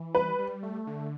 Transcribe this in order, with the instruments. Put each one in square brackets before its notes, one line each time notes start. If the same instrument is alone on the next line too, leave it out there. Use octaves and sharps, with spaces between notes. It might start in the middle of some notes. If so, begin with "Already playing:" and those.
Already playing: [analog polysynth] E3
[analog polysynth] G3 [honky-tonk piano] B4
[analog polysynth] G3
A3
D3